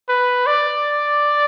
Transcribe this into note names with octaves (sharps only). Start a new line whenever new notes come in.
B4
D5